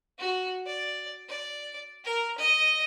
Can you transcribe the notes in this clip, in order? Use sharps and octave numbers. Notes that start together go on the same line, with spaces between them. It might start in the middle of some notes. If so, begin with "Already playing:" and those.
F#4
D5
D5
A#4
D#5